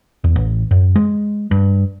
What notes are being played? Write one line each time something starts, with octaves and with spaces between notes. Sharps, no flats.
E2
A1
F#2
G#3
G2